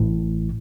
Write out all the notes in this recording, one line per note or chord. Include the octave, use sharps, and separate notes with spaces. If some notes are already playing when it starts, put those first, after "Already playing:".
Already playing: A1 A2